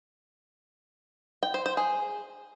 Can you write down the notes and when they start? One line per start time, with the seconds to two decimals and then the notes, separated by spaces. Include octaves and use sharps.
1.43 G5
1.54 C5
1.66 C5
1.77 G#4